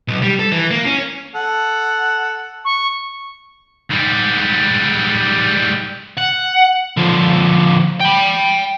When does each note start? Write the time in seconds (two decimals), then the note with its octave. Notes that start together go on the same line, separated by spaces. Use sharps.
0.08 B1
0.22 G3
0.39 A4
0.52 E3
0.71 A#3
0.85 C#4
1.35 A4 F#5
2.65 C#6
3.90 G#2 G3
6.18 F#5
6.97 D3 F3
8.00 G5 B5